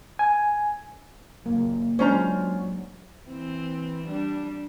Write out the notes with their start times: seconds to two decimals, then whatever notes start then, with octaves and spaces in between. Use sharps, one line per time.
0.19 G#5
1.46 F#1 A#3
1.99 F#3 G#3 C#4 D4 F4 C5 A#5
3.29 E3 C4
4.07 G3 D4